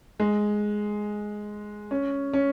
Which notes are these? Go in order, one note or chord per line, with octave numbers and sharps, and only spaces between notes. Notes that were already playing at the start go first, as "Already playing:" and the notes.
G#3
C#4
C#4